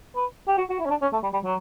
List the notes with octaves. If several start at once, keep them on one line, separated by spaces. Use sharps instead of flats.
B4
G4
F#4
F#4
E4
C#4
D4
C#4
A3
G3
G3
F#3